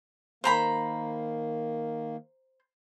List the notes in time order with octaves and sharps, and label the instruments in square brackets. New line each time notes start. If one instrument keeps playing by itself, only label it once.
[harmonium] D#3 A#3 [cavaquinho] C5 A#5 B5